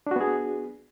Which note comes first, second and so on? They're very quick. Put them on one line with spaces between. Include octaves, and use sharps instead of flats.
D4 F#4 B3 G#4